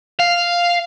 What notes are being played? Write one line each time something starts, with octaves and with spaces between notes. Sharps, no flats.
F5